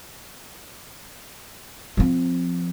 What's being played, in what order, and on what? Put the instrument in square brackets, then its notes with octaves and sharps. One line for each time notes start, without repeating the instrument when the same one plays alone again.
[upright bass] F3 C4